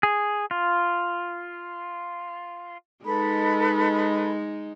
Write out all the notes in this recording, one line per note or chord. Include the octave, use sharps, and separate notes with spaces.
G#4
F4
G#3 D#4 A4 B4 B5